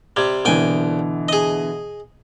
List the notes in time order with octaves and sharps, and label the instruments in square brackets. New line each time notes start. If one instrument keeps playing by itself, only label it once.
[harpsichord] C3 G3 [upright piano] G#6
[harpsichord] C2 G5 G#5 [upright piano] B2 D3 E3
[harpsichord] G#4 D#5